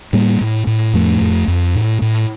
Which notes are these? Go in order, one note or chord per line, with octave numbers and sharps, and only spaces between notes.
A2 G3 A#3
A2
A2
F2 F3 A3
F2
F2
A2
A2